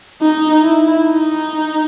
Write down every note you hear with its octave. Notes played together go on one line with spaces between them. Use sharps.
D#4
E4
D#4